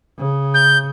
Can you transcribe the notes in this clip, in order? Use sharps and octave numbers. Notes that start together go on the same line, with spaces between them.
C#3
G6